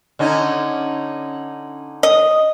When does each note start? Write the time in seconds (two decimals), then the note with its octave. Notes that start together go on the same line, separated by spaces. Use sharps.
0.19 D3 C#4 D#4
2.03 D#5